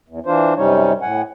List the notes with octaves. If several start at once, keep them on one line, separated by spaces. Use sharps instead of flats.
E2
E3 D4 F4 C5
F#2 C3 G3 C#4 D#4 C#5
A2 F#5 G#5